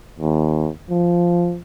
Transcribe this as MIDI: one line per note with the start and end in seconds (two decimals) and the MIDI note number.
0.19 0.69 39
0.90 1.60 53